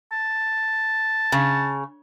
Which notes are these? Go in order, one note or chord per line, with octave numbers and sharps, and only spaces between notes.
A5
C#3